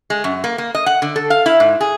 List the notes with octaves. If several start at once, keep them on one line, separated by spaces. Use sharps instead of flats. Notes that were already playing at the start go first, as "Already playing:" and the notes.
G#3
F#2
A#3
A#3
D#5
F#5
D3
A4
F5
E4
G#2
G#4